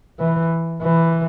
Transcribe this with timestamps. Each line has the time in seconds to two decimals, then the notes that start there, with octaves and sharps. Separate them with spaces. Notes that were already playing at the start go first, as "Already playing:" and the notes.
0.20 E3
0.82 E3